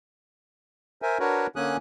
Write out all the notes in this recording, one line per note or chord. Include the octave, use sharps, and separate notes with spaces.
A#4 C5 E5 G#5
D4 F#4 A#4 B4 C#5
D3 A#3 C#4 G#5 D#6 F#6